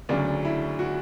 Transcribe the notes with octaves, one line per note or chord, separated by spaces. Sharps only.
D2 C#3 F#3 D4
E4
F#4